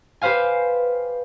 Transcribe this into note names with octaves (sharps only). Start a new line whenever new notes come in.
G4 B4 C5 F5 G#5